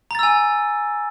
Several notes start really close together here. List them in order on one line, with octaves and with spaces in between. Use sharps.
A#5 A6 E6 G#5